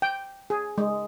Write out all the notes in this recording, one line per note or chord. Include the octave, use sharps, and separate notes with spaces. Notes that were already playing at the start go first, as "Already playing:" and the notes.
G5
G#4
G#3